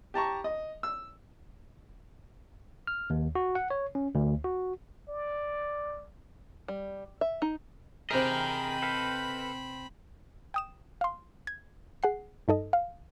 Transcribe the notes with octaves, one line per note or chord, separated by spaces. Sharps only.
G4 A5 A#5 C#6
D#5
E6
F6
D#2
F#4
F#5
C#5
C#4
D2
F#4
D5
G3
E5
D#4
C3 C4 G#4 A#4 D#5 E5 G5 B5
A4 B4 F5
G5 D#6 E7
F5 C6
G#6
G#4 F#5 C7
G2 D#4 A4 D#5
F5